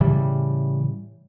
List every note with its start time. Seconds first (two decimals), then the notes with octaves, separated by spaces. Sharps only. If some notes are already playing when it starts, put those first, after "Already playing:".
0.01 A2 C#3 E3 G3